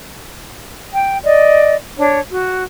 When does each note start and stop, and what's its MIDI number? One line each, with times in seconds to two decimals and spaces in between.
0.93 1.17 79
1.24 1.75 74
1.24 1.75 75
1.98 2.19 62
1.98 2.19 73
2.31 2.64 66